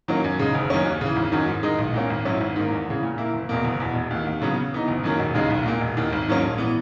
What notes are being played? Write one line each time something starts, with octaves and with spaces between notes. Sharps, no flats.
D#3 F#3 A#3 C#4
F#2
C#3 G#3 D#4
F#1
F#2 D#3 A#3 C#4
D#2
C#3 E3
G#1
F#2 D#3 F#3
G#2
D#3 G#3 D#4
B1
A#2 A#3 C#4
G#1
G#2 F#3 C#4 E4
G#1
G#2 D#3 A#3
E2
C#3 E3
A#2
A#3 E4
F#1
E2 B2 A#3
F#1
E2 B2
E1
D#2 D#3
D#2
C#3 F#3 B3
C#3
E3 B3 D#4
F#1
F#2 D#3 F#3 A#3
E1
D#2 C#3 G#3 D#4
B1
A#2 A#3
E1
D#2 D#3
G#1
G#2 F#3 A#3 C#4
A#1
E3 B3